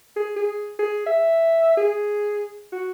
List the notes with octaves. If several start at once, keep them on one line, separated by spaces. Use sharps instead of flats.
G#4
G#4
G#4
E5
G#4
F#4